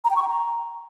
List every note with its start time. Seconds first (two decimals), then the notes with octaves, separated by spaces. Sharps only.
0.04 A#5
0.10 G5
0.16 C#6
0.22 G5
0.28 A#5